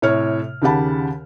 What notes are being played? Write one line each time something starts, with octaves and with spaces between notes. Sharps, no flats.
A2 C3 C#5 F6
D#2 C#3 G4 F#5 A5 B5